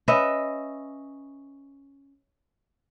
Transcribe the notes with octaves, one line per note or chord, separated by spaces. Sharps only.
C#4 B4 D#5 E5